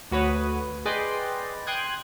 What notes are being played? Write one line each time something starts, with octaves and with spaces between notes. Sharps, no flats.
D2 F#4 B4 C#5 D#6
G#4 B4 D5 D#5 G5 C6
G5 C6 D#6 F#6 G#6